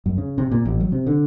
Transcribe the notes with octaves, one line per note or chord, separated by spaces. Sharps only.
F#2
C#3
C3
A#2
A1
F#3
C3
D3